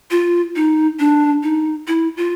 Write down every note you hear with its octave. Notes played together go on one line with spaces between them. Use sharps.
F4
D#4
D4
D#4
E4
F4